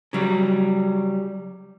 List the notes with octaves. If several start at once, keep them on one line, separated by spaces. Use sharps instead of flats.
C#3 F#3 G3